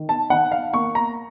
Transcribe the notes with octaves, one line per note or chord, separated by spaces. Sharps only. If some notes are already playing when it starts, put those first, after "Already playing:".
Already playing: D#3
A5
D#3 F#5
F5
A#3 C#6
A#5